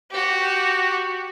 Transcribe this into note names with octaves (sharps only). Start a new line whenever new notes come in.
F#4 G4